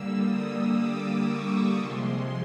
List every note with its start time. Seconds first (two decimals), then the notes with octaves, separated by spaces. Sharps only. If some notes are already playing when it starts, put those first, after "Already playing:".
Already playing: D3 G3 A#3 E6
0.18 D#6
0.72 D6
1.25 C#6
1.78 C3 F3 G#3 C6